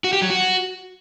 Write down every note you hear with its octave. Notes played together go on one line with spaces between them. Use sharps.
F#4
G4
F#3
F#4